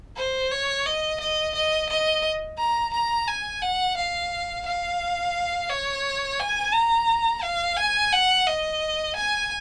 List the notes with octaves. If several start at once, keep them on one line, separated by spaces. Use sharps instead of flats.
C5
C#5
D#5
D#5
D#5
D#5
A#5
A#5
G#5
F#5
F5
F5
C#5
G#5
A#5
F5
G#5
F#5
D#5
G#5